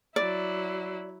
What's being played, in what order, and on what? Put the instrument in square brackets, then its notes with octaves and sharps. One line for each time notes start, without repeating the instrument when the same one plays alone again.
[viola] F#3 E4 [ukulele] D5